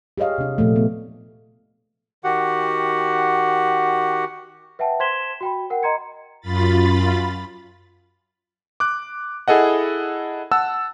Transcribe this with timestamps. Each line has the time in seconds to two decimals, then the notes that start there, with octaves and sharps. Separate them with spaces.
0.18 G4 G#4 C#5 D#5 F5
0.38 C3 D4
0.58 A#2 F3 A3
0.76 B3
2.24 D#3 F#4 G4 F#5
4.79 B4 E5 F#5 G5 A5
5.00 C5 C6 G#6 B6 E7 G7
5.41 F#4 G5 B5
5.70 A#4 F#5 G5
5.83 D#5 A#5 C6 G#6 C#7
6.40 F#2 F4 B5 A6
8.80 D6 F#6
9.48 E4 G#4 A4 D#5 F#5
10.51 F#5 A5 E6